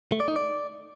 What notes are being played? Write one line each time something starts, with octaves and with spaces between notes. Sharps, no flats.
A3
D5
D#4
D5